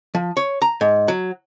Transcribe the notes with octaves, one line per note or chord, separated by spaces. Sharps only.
F3
C#5
A#5
G#2
F#3